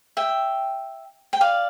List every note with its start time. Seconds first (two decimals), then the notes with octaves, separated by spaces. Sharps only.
0.17 E5 G5
1.33 G5
1.41 D5 F5